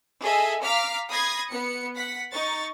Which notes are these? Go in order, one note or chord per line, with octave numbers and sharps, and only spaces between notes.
G#4 A4 D#5 E5 G#5
F5 A#5 D6 F6 B6
B5 D#6 G#6 A#6 C7
B3 C#7
F#5 B6
D#4 C#6 A6